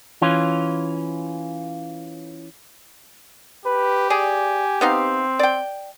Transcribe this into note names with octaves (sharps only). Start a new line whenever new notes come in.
E3 C#4 F4
G4 B4
G#4 D5 G#5
B3 C4 D#4 F5
D5 G5